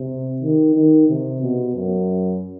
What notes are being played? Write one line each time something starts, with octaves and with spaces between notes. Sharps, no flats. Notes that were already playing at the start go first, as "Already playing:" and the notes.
Already playing: C3
D#3
D#3
C3
B2
F#2